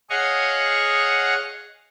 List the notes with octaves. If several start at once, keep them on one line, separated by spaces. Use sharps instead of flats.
G#4 C#5 D#5 F5 F#5 C#6